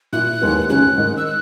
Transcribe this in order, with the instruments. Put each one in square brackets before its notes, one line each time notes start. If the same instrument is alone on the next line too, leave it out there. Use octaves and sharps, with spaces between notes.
[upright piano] A#2 A#3 E4 [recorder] F#6
[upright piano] D#2 D#3 G#3 B3
[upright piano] C#2 C#3 G#3 C#4 [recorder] F#6
[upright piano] G#2 D#3 G#3 D#4
[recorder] E6
F#6